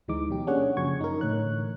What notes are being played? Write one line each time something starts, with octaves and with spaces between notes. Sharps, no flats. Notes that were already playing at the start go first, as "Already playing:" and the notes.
D2 E3 G#3 D#4 D6
B2 F#3 G4
A#3 C#4 D4 G#4 C#5 F#5
F#2 C#3 F3 F#3 C#6 G#6
D#4 A#4
A2 D3 E3 C#5 F#6